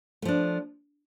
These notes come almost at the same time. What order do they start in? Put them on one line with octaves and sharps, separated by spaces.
A3 F3 D4